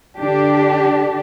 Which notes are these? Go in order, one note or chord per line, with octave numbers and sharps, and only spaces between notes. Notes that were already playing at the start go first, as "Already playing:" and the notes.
D3 D4 G4